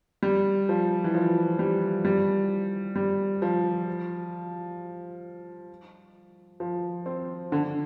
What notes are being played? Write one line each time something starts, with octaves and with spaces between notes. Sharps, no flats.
G3
F3
E3
F3
G3
G3
G3
F3
F3
C4
D3